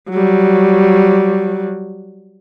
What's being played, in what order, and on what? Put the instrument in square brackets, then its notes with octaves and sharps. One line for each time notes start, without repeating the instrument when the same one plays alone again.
[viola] F#3 G3